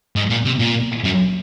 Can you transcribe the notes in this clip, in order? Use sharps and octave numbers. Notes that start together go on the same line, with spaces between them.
G#2
A#2
C3
A#2
F#2